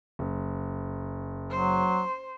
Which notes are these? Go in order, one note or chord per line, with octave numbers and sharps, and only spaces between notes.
F#1
F#3 C5